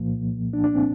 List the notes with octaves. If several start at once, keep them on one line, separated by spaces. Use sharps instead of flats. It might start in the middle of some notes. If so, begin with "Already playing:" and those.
Already playing: C2 A#2 F3 A#3
D4
D4
C4